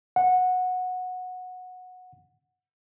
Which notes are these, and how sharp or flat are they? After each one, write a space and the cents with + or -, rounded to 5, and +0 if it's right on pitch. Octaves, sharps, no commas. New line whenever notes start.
F#5 -15